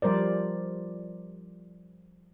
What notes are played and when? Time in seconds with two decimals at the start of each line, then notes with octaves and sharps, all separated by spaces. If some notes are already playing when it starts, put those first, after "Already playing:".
0.02 F3 G3 A#4 C5 D5